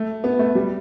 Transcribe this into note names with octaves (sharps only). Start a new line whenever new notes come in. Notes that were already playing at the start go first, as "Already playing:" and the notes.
Already playing: A3
B3
A3
G3